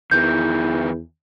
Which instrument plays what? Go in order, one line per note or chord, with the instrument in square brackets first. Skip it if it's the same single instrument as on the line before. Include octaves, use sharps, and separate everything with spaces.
[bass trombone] E2 [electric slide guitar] D#3 E3 [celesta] G6